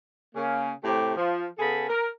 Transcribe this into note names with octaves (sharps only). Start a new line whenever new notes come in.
C#3 A#3 C#4
A2 C3 A3 G4
F3
C#3 B3 G#4 A4 A5 B5
A#4